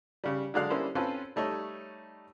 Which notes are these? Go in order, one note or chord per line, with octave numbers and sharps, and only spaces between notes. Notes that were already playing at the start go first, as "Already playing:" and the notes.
C#3 G3
D3 F#3 G#3 D4 F5 F#6
G3 A#3 C#4 D4 E4 C5
C4 C#4 F4 A4 B4 C5
G3 A3 D#4 C#5